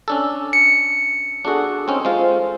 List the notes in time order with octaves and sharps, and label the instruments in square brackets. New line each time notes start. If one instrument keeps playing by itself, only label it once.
[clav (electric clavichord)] C#4 D4 A4
[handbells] C#7
[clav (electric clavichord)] D4 F#4 [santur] G#4 A4 D6
[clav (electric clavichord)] C4 C#4 D#4
[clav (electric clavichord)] G#3 F4 [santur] C5